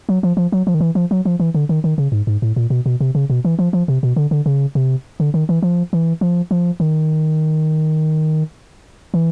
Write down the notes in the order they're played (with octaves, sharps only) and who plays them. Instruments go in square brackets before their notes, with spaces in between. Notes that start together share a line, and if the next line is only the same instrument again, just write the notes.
[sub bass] F#3
F3
F3
F#3
F3
D#3
E3
F3
F#3
F3
E3
D3
D#3
D#3
C#3
G#2
G#2
A2
A#2
B2
B2
C3
C#3
B2
E3
F3
F3
C3
B2
D3
D3
C#3
C3
D3
D#3
E3
F3
E3
F3
F3
D#3
E3